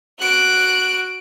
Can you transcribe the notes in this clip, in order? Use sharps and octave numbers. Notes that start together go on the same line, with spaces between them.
F#4 F#6 D7